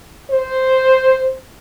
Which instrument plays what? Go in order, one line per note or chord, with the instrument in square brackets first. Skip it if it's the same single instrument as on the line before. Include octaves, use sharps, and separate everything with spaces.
[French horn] C5